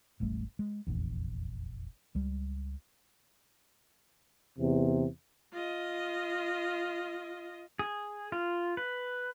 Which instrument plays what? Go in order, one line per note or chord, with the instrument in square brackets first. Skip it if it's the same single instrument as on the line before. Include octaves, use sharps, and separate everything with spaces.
[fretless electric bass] E1 A1 G3 A3
G#3
F1 A#1 E2
C#2 G3
[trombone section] E2 C3
[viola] F4 D#5
[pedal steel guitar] G#4
F4
B4